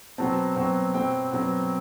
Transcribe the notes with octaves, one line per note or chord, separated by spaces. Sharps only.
B2 F#3 C4 A5
B2 F#3 C4
B2 F#3 C4 G5
B2 F#3 C4